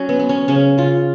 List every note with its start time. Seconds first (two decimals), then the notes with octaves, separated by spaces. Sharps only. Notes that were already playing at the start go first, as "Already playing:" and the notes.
Already playing: F#3 C#4
0.09 B3
0.19 B3
0.29 C#4
0.48 C#3 C#4
0.78 C#3 F4